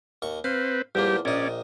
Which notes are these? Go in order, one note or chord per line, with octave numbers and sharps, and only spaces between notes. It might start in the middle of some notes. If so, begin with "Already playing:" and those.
D#2 C#6
C4 B4 F5
E2 F3 G3 A#3 G4
A#1 C#4 D#4 D5